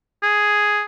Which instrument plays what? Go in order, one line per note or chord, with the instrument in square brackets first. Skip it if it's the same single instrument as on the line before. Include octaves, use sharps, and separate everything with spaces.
[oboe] G#4